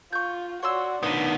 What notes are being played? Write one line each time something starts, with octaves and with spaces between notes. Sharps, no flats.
F4 C#6 G6
F#4 C#5 D5 C6 E6
D#3 B3 D4 D#6